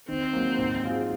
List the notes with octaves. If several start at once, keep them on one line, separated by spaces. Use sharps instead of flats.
D#3 C4
F#3 A#3
G#2
F#3 C4 F4 G#4